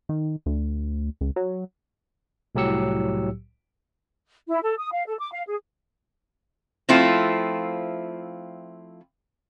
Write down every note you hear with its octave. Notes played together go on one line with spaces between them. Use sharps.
D#3
D2
C#2
F#3
C2 A2 F#3 G4 E6 C#7
E4
A4
D#6
F5
A4
D6
F5
G#4
F3 A3 C4 E4 F4